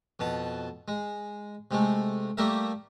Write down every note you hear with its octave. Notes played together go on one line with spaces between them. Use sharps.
F2 B2 A5
G#3
C3 G#3 A3
G3 A3 A#3 G4 A#4 E5